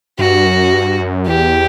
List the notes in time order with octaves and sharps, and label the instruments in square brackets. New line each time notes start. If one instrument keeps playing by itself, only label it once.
[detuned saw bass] G2 [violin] F#4
[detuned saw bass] F#2
G2
F#2
[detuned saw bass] E2 [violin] G4